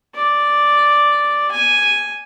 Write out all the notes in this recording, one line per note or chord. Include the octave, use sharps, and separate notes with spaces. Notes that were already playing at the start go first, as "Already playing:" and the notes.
D5
G#5